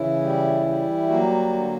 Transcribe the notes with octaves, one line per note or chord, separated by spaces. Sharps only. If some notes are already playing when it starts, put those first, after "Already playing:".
Already playing: C#3 E3 E4
G3
G3
F#3 A#3 F#4
D3